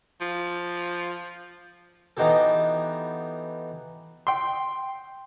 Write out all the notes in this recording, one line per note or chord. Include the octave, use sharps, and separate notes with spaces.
F3
E3 B3 D#4 F#4 G4 A4
G5 C6